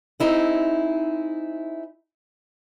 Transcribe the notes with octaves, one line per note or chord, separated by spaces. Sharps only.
C4 D#4 E4 G#4